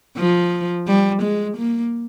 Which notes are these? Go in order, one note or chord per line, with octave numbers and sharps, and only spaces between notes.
F3
G3
G#3
A#3